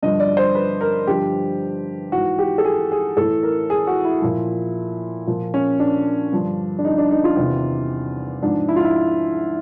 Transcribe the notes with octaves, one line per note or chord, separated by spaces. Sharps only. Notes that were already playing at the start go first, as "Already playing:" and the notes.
G2 D3 F3 D#5
D5
C5
B4
A#4
G2 D3 F3 G4
G#2 E3 F#4
G4
A4
G#4
G#4
A2 E3 A4
A#4
G#4
F#4
E4
A#2 F3
A#2 F3
C#4
D4
G2 D3 F3
D4
D#4
D4
D#4
F4
E2 C3 D#3
G#2 F3 D4
E4
F4
E4